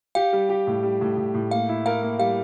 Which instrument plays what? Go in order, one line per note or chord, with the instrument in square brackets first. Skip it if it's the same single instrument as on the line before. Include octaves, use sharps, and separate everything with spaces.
[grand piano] G4 [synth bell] F5
[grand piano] G3
G4
A2
G3
A2
A2
A2
[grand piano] A#3 [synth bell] F5
[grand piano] E4
[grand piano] A#4 [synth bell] F5
[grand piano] A#3
[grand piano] G3 [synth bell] F5